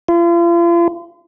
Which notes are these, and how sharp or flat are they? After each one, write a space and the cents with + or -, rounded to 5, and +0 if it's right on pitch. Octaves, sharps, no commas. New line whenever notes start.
F4 -40